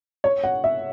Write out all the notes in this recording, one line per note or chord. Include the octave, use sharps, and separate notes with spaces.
C#5
F#5
E5